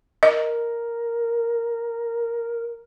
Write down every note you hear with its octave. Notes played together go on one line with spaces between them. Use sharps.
A#4 D#5